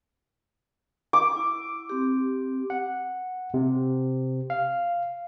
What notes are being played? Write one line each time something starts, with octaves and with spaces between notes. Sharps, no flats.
D6
E4
C4 G4
F#5
C3
F5